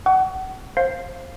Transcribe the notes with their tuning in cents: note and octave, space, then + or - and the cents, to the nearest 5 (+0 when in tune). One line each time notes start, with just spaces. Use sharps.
F#5 +30 C#6 +35
C5 +25 F5 +5